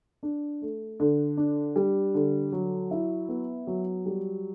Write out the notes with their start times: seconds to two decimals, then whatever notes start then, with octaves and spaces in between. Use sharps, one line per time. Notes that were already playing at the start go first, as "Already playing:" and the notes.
0.23 D4
0.62 A3
1.00 D3
1.37 D4
1.76 G3
2.15 D3
2.52 F#3
2.91 E4
3.29 B3
3.67 F#3
4.06 G3